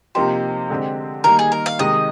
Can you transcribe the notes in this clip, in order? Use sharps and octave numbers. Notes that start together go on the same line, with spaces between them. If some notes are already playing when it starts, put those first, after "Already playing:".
C3 F3 A#3 D#4 G4 C5
D3 G#3 C4 G4
D#3 G3 A#3 D#4 A#4
G#4
A#4
F5
C3 D#3 G#3 D#4 G4 D#5